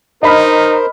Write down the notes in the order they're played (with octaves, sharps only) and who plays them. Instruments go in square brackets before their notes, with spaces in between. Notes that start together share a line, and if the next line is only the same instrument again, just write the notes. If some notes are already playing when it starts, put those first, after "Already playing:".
[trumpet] D#4 [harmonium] A#4 C5 [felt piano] D#5 B5 F6